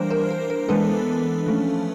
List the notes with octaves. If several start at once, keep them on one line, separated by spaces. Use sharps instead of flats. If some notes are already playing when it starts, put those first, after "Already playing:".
Already playing: E3 G3 A#3 D4 A#4 C5
A#4 C5
A#4
A#4
E3 G#3 B3 D4 A4 B4
F3 A3 C#4